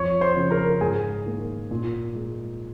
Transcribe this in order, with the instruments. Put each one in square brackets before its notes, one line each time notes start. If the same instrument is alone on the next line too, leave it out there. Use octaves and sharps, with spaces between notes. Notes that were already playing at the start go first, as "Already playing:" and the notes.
Already playing: [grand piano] F2 C#5 C#6
C5 C6
C#3 F3
A#4 A#5
G#2 G#4 G#5
D#3 A#3
A#2
G#3